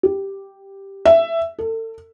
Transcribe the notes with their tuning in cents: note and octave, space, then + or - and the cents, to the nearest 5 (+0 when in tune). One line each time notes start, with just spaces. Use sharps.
G4 +0
E5 +10
A4 +35